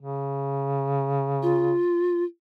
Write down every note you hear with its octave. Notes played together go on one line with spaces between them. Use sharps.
C#3
F4